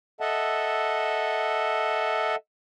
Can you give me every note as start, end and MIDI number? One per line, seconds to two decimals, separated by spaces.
0.20 2.36 69
0.20 2.36 75
0.20 2.36 76
0.20 2.36 78
0.20 2.36 81